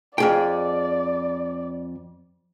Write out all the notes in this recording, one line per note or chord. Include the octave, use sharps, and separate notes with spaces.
F2 G#4 D5 G5